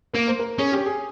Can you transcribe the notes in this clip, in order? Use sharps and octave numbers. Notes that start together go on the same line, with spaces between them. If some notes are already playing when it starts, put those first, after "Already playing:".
A#3 A#4
C5
A#4
C#4 G#4
G4
G#4